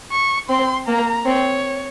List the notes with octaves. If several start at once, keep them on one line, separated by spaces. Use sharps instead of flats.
C#6
C4 C6
A#3 A#5
C4 C#5